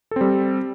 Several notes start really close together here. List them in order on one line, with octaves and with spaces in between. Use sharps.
A4 C4 G3